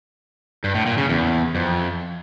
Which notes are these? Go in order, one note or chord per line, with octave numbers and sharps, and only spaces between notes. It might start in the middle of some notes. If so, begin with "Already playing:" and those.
G2
A2
A#2
C#3
E2
F2